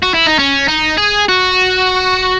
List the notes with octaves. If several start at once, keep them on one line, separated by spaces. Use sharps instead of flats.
F#4
E4
D#4
C#4
D#4
G#4
F#4